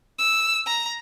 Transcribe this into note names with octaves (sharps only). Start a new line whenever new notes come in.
E6
A#5